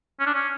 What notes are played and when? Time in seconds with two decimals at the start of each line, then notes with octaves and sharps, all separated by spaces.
0.20 C#4
0.26 D4
0.34 C#4